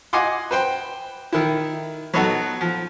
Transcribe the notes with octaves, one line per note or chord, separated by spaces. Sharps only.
D#5 F#5 G#5 C6 D6
B4 C5 G5
D#3 E4
F#3 B3 D#4 A4 F#5
F3